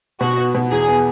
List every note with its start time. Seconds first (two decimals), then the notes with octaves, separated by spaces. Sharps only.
0.21 B2 F#4
0.37 B3
0.55 B2
0.71 E2 G#4
0.88 B3